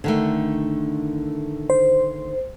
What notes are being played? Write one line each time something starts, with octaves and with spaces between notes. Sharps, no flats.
D3 D#3 A3
C5